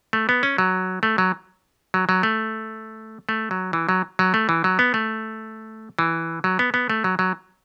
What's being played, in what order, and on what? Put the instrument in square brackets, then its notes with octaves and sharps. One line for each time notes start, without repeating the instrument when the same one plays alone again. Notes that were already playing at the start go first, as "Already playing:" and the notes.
[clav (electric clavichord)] A3
B3
C#4
F#3
A3
F#3
F#3
F#3
A3
A3
F#3
E3
F#3
F#3
A3
E3
F#3
B3
A3
E3
F#3
B3
B3
A3
F#3
F#3